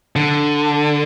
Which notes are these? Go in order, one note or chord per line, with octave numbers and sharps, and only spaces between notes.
D3